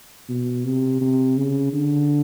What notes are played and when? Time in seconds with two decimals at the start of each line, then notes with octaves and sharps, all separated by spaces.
0.29 B2
0.65 C3
1.01 C3
1.37 C#3
1.73 D3